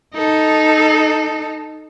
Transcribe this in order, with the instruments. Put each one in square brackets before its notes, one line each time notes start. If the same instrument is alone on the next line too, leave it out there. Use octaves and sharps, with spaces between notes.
[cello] D#4 A4